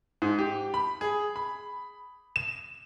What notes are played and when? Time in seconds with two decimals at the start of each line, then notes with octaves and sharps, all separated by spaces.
0.22 G#2
0.39 G4
0.74 B5
1.01 G#4
1.36 B5
2.36 E7